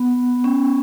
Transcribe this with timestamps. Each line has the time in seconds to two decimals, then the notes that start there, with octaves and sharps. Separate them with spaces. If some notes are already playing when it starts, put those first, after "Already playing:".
Already playing: B3
0.44 C#4